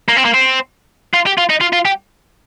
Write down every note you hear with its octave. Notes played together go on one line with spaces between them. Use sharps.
A#3
C4
A#3
C4
F4
G4
F4
D#4
F4
F4
G4